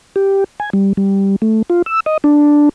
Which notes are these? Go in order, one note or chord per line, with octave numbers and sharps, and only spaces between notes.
G4
G#5
G3
G3
A3
F4
E6
D#5
D4